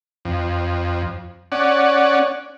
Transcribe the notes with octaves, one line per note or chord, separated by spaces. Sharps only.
F2
C#4 D5 F#5